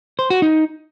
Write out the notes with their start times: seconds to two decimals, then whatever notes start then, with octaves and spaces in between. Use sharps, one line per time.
0.19 C5
0.30 F#4
0.42 D#4